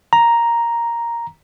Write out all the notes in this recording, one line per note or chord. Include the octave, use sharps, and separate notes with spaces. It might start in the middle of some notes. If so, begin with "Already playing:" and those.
A#5